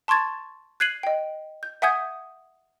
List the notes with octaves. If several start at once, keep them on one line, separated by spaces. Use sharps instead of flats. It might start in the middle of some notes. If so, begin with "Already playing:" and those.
A5 C6 C#6 G#6 A6
F#6 G#6 C7 D#7 F#7
D#5 G5
G6
E5 F#5 G#5 D#6 G6 G#6